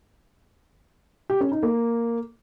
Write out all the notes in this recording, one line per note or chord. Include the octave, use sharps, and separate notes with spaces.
G4
C#4
D#4
A#3